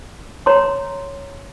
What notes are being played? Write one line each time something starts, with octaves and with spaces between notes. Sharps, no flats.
C#5 A#5 C6